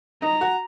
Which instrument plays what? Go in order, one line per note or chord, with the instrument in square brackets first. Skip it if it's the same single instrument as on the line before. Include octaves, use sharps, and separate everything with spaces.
[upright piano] D#4 [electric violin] A#5
[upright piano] F#4